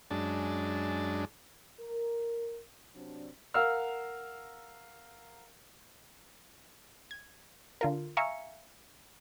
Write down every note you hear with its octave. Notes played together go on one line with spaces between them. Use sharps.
F#2 G#3 D4 A5
A#4
C3 F#3 C4 D4
A#4 F5 F#5 E6 F6
G#6
D3 F4 A#4
E5 F5 G#5 A#5 C#6 C#7